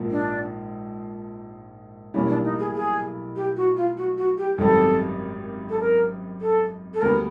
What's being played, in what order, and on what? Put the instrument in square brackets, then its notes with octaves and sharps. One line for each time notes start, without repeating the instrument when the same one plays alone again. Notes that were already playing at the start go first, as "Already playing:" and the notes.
Already playing: [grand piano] A#1 G#2 F3 A#3
[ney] D4
[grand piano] B1 A2 E3 G3 A#3 [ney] C#4
[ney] D4
D#4
G#4
G#4
G4
F#4
F4
F#4
F#4
G4
[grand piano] G#1 F#2 D#3 G3 C4 [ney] A4
[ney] A4
A#4
A4
A4
[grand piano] D2 D3 G3 B3 [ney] A#4